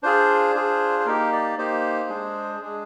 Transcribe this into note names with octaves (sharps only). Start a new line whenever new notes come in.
D4 F4 G#4 C5
D4 F4 G#4
C5
A#3 D#4 G4 A#4
D5
A#3 D#4 G4 C5
G#3 D4 G#4
G#3 D4 G#4